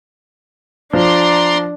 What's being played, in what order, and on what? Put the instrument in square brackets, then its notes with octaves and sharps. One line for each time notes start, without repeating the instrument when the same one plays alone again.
[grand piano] F3 [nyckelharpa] D4 [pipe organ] D5 A#5 C6